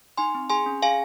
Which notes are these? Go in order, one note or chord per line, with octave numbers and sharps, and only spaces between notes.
D#4 G#5 C6
C4
G#4 G#5 C6
C#4
G#4 F5 G#5